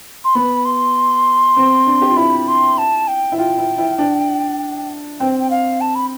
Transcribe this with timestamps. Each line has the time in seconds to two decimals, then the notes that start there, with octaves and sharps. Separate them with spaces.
0.24 C6
0.35 B3 B5
0.65 C6
1.56 C4
1.86 D4
2.02 G4
2.09 F4
2.16 E4 B5
2.48 C6
2.78 A5
3.08 G5
3.32 E4
3.38 F4 G5
3.58 E4
3.78 E4
3.98 D4
5.20 C4 G5
5.39 G5
5.51 F5
5.81 A5
5.95 B5